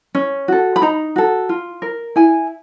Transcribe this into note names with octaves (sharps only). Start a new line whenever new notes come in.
C#4
F#4 A4
B5
D#4 A#5
F#4 A4
F4
A#4
E4 G#5